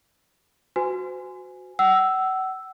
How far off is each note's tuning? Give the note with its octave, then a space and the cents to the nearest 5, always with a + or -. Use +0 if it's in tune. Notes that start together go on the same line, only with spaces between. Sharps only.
F#4 -10 C5 -45 G#5 +0
F#5 +35 E6 +0